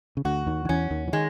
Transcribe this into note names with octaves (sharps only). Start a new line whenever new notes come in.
C#3
D2 D3 F#4
D#2 D#3
D#3
E2 E3 C#4
D#2 D#3
E3
D#3 G#3